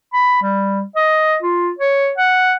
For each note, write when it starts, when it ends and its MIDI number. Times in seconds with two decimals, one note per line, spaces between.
0.13 0.41 83
0.42 0.82 55
0.96 1.36 75
1.42 1.70 65
1.79 2.12 73
2.17 2.53 78